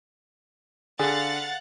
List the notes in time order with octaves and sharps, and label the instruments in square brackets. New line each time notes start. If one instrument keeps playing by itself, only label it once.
[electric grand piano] D3 [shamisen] G#4 [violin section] F5 F#5 A6